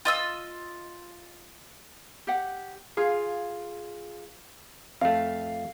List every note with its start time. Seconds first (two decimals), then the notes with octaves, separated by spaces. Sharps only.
0.05 F4 D#5 E6
2.27 G4 F#5
2.97 F4 G#4 F5
5.01 F2 A3 F5